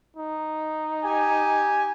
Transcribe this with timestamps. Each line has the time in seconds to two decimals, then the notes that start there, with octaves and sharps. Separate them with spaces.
0.16 D#4
1.04 G4 G#5